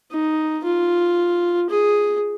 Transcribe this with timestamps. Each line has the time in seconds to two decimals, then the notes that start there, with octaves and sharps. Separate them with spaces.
0.12 D#4
0.64 F4
1.70 G#4